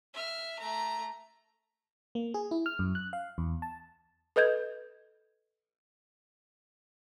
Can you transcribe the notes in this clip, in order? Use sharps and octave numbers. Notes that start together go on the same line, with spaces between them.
E5 F6
A3 A#5
A#3
G#4
E4
F6
F#2
F#6
F5
E2
A5
A4 B4 D#5 G6 G#6